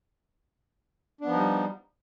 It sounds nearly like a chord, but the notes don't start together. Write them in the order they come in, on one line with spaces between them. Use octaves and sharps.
D4 B3 F3 D#4 G3